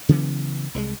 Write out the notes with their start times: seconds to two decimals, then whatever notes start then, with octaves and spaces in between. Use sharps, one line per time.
0.09 C#3 E3 F#3 B3
0.74 C2 F3 G#3